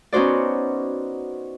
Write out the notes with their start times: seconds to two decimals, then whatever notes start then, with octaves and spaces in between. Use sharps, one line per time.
0.12 B3 C#4 D#4 F#4 C5 D5